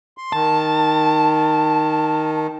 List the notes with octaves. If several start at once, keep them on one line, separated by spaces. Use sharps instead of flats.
C6
D#3 A5